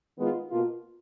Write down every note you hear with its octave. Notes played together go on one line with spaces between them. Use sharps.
D#3 G#3 B3 F4
B2 A#3 F4